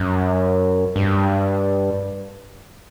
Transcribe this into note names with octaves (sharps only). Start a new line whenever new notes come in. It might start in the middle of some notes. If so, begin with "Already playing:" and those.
Already playing: F#2
G2